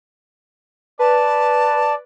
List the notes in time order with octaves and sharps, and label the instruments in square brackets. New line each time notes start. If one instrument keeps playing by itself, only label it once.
[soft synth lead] B4 [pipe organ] D5 [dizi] A5